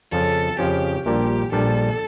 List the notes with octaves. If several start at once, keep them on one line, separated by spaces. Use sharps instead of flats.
F2 C#3 F3 C#4 A4
F2 C#3 F3 C#4 G4
A#1 A#2 G3 D4 G4
A#1 A#2 G3 D4 A4